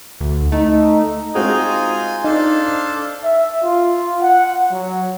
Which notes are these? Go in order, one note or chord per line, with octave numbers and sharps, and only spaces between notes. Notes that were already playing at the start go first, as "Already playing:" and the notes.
D2
A3 D#4
G#3 C4 D#4 F4 F#4 G#5
D4 D#4 A4 C5 F5
E5
F4
F#5
F#3